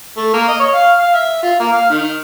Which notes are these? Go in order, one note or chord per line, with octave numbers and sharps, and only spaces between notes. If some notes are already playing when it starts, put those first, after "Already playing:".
A3
A#3
D#5
C#5
F5
F5
E5
F4
A#3
F5
D#3